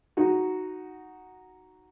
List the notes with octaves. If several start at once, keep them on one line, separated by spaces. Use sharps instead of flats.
D#4 F#4